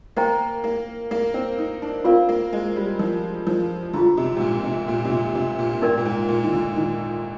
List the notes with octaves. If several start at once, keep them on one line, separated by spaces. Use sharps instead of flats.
A#3 C5 D#5 G5 A#5
A#3
A#3
C4
D#4
D4
C4 F4 A#4 D5 F5
A#3
G#3
G3
F3
F3
D3 F4 G#4 D#5 A#5
C3
G#2
A#2
C3
A#2
C3
A#2
C3
A#2
G#2 D#4 A#4 D5 G5
A#2
G#2
A#2
D#3
D3
D#3